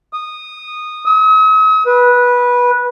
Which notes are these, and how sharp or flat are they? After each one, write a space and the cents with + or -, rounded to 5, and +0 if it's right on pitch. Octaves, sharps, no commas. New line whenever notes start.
D#6 -15
D#6 +45
B4 -15